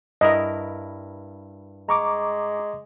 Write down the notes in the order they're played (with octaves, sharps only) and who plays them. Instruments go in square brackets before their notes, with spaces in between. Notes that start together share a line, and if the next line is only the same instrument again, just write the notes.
[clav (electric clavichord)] G2 E4 A#4 [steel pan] D#5
[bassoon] G#3 [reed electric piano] A#5 C#6 D6